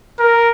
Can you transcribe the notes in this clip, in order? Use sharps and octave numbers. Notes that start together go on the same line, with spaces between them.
A#4